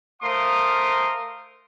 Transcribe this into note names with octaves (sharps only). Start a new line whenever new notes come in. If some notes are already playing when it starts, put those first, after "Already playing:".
A3 A#4 C5 F5 C6 D#6